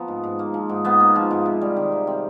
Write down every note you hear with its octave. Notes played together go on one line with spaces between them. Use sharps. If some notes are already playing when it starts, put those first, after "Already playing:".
Already playing: F3 A#3 B3
G#2
G#2
A#3
F3
G#2
G#2 B3
A#3
F3
G#2
C3
G3
D#3
C3
C3 C4